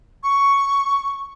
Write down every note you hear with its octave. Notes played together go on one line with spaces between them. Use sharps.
C#6